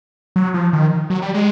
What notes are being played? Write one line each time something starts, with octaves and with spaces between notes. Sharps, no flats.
F#3
F3
D#3
F#3
G3
G#3